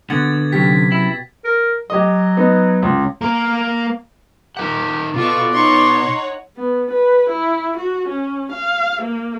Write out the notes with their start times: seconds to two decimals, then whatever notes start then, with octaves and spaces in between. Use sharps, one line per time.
0.10 B2 D3 F#5 G#6 A6
0.53 C3 F#3 C#4 G4 B6
0.92 E4
1.45 A#4
1.90 F#3 G4 D#5
2.37 B3 D#4
2.82 C#2
3.21 A#3 A#4
4.57 D#4 G4 A#4 F#5
5.14 B2 B3 F4 A4 D5 C#6
5.53 D#4 C#5 F#5 C6 C#6
6.57 B3
6.91 B4
7.30 E4
7.78 F#4
8.08 C#4
8.52 F5
9.02 A#3